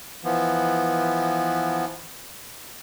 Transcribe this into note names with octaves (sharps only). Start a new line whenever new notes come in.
E3 F3 B3